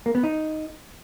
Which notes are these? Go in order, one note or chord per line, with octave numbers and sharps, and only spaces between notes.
A#3
B3
D#4